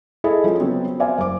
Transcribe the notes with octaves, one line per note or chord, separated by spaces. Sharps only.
E4 G#4 A4 D#5
F3 G#3 C#4
C#3 F#3 B3 C4
C5 D5 E5 F5 G#5
F#1 D6